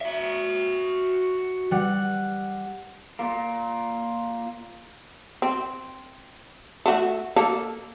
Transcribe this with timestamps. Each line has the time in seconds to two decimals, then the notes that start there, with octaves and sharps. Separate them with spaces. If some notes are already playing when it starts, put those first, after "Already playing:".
0.01 F#4 E5
1.71 G3 F#5
3.19 A#2 A#3
5.42 C4
6.86 A3 F#4
7.36 A#3 A4